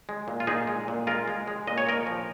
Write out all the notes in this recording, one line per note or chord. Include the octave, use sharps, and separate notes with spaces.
G#3
A#2
F4
A#2 D#4 G#4
G#3
A#2
G#3 F4 A#4
G#3
G#3
A#2 D#5
C#5
A#2 A#4 D#5
F3